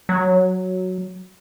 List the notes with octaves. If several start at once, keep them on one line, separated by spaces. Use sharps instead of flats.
F#3